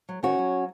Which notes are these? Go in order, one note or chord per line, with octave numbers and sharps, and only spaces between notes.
F#3
D#3 C#4 F#4
F#3